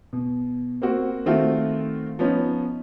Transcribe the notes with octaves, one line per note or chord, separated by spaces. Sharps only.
B2
A#3 C4 F#4
D#3 A3 C4 F4 F#4
F3 B3 C#4 D#4